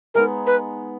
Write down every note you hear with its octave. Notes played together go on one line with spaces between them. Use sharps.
G#3 B3 D#4 A#4
B4